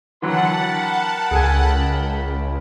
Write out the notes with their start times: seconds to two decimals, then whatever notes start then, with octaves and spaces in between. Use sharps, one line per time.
0.22 D3 E3 F#3 A#4 F#5 G5 A5 B5
1.31 C#2 G#4 A4 G#5